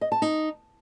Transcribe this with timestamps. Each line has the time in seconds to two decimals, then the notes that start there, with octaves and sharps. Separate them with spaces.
0.01 D#5
0.12 A5
0.22 D#4